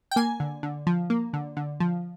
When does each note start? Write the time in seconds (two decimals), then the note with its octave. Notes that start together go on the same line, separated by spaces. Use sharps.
0.11 G5
0.16 A#3 G#5
0.40 D3
0.63 D3
0.87 F3
1.10 A#3
1.33 D3
1.57 D3
1.80 F3